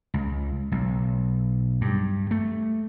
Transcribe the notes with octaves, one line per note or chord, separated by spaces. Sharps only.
C#2
B1
G2
A3